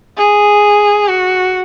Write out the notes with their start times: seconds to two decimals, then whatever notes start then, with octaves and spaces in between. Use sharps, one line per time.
0.17 G#4
1.08 F#4